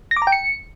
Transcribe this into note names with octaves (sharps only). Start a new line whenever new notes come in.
A#6
D6
A#5
G5
C#7